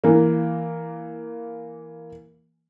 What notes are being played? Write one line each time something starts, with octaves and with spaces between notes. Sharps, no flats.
E3 A#3